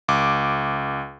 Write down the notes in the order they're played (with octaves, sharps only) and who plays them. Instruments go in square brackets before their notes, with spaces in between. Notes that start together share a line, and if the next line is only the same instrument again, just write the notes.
[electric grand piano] C#2 D6